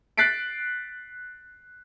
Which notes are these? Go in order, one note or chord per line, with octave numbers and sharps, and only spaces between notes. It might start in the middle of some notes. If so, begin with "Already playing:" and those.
F#6 A6 B6 C7 D7